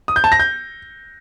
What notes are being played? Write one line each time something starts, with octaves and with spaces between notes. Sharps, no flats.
D#6
G6
A5
A#6
G6